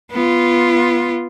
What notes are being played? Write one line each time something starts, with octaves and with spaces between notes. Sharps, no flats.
B3 F4